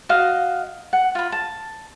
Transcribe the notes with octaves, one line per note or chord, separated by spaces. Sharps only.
F#4 D#5 F5
F#5
F4 B5
A5